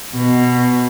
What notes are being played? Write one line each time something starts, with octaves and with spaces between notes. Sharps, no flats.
B2